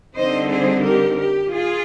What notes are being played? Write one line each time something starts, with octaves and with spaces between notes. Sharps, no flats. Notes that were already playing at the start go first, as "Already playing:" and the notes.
D3 G3 C4 D#4 C5 D#5
G#4 C5
G4 A#4
G4
F4 G#4